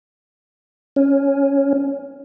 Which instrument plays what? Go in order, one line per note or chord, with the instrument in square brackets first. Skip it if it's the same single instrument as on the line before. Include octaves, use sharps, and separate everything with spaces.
[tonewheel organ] C#4